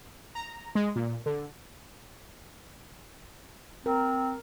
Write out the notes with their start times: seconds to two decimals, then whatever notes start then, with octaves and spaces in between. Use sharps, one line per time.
0.35 A#5
0.75 G#3
0.96 A#2
1.26 D3
3.86 C4 A#4